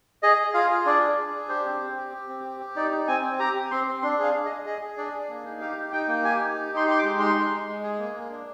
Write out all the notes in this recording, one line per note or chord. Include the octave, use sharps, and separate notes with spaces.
G#4 D#5
G#4
F4 F5
G#4
D4 D5
G#4
G#4
D4
G4 C5
C4
C4
G4
G4
C4
G4
G4
D#4 D5
D#4
C4 G#5
C4
G4 A#5
G4
C4 C6
C4
D4 C6
G#4 F5
G#4
D#5
G#4
G#4 D#5
G#4
D4 D5
G#4
A#3
D#4
G4 F5
D#4
D#4 G5
A#3
G4 G#5
D#4
G4
D#4 C6
G4 C6
D6
G#3
D#4 C6
G#3
G#3
G#3
G#4
A#3
A#3
D4